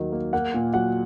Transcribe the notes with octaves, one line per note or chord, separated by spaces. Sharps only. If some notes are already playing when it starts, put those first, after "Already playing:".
Already playing: D#2 D#3 F#3
A#3
A#3 F#5
A#2
F#3 F#5